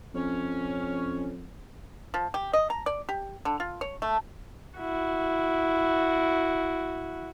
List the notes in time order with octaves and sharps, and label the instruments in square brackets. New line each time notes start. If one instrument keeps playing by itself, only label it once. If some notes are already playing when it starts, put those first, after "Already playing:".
[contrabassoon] F2 [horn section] C#4
[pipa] F3
G4
D#5
A#5
D5
G4
D3
F4
C#5
A3
[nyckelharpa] E4 F#4